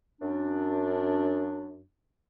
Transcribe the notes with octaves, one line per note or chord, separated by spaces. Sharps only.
F#2 D4